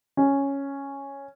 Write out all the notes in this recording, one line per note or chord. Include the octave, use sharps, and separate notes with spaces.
C#4